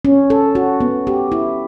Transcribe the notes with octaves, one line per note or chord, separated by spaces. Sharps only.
C#4
A4
F#4
B3
G4
E4